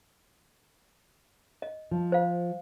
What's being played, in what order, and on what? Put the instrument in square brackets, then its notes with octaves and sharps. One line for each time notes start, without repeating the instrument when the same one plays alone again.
[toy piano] D#5
[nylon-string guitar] F3
[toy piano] C5 F5